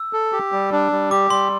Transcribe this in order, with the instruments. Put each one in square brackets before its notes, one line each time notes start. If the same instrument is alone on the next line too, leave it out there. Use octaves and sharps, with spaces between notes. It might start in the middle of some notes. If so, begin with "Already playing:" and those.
Already playing: [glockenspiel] E6
[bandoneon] A4
G4
G3
D4
G3
[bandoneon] G4 [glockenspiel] D6
[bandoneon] G3 [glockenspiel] C6